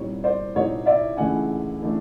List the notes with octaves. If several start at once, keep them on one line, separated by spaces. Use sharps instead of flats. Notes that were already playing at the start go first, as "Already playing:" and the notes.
Already playing: C2 A#2 G3 C4 D#4 C#5
C5 D5
C2 A#2 G3 C4 D#4 C#5 D#5
D5 E5
C#2 C#3 E3 A3 D4 F#5 G#5
C#3 E3 A3 D4